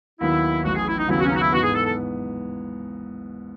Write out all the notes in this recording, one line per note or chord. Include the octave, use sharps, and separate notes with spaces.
D#2 D#3 F#3 B3 E4
A1 A2 F#3 F#4
G#4
E4
D#4
D#2 C#3 F#3 B3 E4
F#4
C#4
D#4 F#4
E4
G#2 E3 B3 F#4
G#4
A4
A4